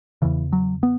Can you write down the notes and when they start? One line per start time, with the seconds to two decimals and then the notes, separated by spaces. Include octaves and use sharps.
0.22 E2 C#3 E3
0.53 F#3
0.83 B3